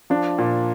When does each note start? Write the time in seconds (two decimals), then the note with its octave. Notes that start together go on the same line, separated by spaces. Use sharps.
0.10 F3 D4
0.38 A#2